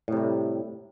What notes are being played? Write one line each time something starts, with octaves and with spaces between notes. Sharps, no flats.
A2 C3 G3